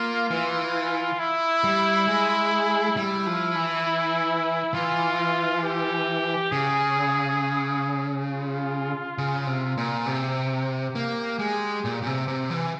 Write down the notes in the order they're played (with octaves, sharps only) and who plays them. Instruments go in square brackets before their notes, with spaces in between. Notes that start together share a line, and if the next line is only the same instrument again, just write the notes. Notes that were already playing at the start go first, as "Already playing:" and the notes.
Already playing: [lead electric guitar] A#3 [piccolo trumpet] F4
[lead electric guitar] E3
[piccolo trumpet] E4
[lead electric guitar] G3
G#3
[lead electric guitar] G3 [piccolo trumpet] E4
[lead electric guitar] F3
E3
[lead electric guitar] E3 [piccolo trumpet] F4
[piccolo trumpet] G4
[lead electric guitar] C#3 [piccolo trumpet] G#4
[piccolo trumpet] F4
[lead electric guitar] C#3
C3
A#2
[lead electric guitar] C3 [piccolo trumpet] G4
[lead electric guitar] A#3
G#3
A#2
A#2
C3
C3
E3